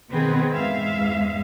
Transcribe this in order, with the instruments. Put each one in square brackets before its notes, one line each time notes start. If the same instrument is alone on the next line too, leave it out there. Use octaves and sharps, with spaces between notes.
[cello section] B2 D#3 B3 C4 G#4 B4
E2 G#2 G#3 E5 F5